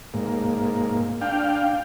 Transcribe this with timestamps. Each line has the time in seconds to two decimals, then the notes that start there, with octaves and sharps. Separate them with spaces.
0.14 G#2 A#3
1.21 D4 F5 G5